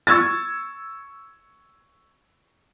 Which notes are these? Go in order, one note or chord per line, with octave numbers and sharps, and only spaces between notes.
C#6 E6 G#6 A6